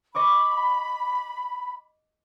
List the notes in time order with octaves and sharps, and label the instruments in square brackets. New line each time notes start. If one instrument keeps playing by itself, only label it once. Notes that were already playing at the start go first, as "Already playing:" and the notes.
[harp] D#5 C#6 D6 [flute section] B5